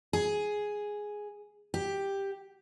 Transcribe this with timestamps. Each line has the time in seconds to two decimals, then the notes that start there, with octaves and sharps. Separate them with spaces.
0.13 G#4
1.74 G4